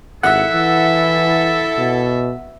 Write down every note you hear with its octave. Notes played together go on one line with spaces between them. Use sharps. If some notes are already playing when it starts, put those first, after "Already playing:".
G#1 E4 A4 E5 F#5
E3
B2